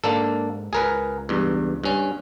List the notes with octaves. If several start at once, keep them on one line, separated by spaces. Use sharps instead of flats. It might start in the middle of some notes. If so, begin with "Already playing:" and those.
G#2 A#3 D4 A4
C#2 G#4 A#4 B4
E2 G2
G2 C#4